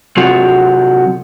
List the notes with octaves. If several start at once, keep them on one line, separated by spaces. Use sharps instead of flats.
C3 F#3 C4 F4 F#4